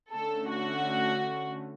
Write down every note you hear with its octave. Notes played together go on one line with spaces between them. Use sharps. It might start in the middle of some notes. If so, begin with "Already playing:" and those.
D3 A3 C#4 A4
F#4